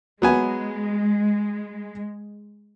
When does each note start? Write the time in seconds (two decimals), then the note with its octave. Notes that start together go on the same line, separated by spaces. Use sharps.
0.22 F#3 G#3 B3 G#5